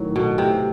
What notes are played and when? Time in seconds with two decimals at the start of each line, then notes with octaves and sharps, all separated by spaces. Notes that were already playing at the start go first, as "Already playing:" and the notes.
Already playing: A2 D#3 F#3
0.16 B2 A3
0.38 A2 C3